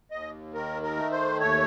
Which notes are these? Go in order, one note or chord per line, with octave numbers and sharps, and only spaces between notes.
D#2 D#5
D#3 A#4
A#4
A3
C5
D#2 C#5